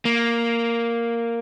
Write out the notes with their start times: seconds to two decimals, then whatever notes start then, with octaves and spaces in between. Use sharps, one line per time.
0.05 A#3